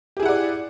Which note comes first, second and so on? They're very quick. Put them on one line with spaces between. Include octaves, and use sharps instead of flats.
G4 G#4 E4 F#5 D5